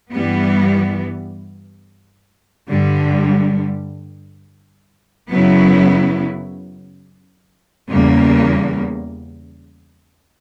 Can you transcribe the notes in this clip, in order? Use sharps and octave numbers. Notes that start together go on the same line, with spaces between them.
G2 E3 G3 B3
G2 D3 G3
F#2 C#3 F#3 B3 E4
E2 C#3 G3 A#3